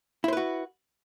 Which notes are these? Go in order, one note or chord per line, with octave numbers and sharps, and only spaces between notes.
E4 F#4 B4 C5